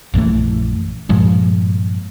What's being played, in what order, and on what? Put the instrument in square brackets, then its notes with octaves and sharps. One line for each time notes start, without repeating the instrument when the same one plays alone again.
[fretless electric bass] A#1 F#2 E3 A3
G2 A#2 F3 G#3